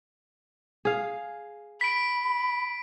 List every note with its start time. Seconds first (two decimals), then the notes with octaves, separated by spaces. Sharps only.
0.85 G#4 F5
1.81 B5 B6 D7